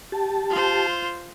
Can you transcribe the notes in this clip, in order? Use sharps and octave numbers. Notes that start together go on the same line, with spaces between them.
G4 A5
F4 C5